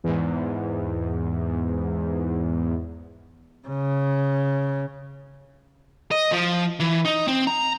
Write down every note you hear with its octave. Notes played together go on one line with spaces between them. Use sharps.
E2 G#2
C#3
D#5
F3
E3
D#4
C4
A#5